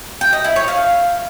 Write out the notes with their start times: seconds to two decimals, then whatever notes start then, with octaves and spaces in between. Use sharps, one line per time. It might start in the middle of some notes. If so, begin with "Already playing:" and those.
0.21 G5
0.33 D#5
0.44 E4
0.56 C#5
0.68 F5